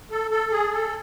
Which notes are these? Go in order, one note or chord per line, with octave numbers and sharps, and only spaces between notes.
A4
A4
G#4
A4